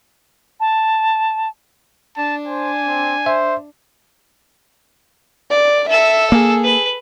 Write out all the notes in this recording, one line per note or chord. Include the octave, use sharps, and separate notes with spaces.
A5
D4 A5
C5 G#5
C4
C5 E5
D5
A4 E5 E6
A#3 G#4
B4